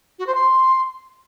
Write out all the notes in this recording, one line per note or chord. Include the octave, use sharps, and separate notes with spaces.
F#4
C5
C6